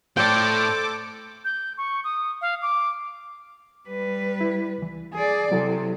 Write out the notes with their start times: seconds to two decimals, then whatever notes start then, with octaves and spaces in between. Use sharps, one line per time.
0.17 A2 A4 C5 D5 G5 D6
1.45 G6
1.78 C#6
2.04 D#6
2.41 F5
2.62 D6
3.89 G3 B4
4.41 E4
4.78 C#2 E3
5.14 G#4 D5
5.52 C3 F#3 E4 A4